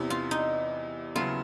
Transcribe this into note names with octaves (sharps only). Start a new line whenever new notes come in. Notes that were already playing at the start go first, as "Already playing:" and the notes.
Already playing: E2 C3 E3
F4
D#4
D#2 C#3 F#3 B3 E4 F4